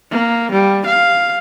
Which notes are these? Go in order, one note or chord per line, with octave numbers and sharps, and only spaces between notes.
A#3
G3
F5